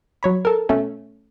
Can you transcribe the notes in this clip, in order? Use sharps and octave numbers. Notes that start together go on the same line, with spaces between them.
F#3 C#5 B5
A4 A#4
B2 A3 C#4